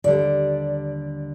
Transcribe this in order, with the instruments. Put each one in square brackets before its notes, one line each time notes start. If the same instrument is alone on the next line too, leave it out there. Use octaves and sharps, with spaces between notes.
[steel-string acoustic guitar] D#2 D3 G3 D5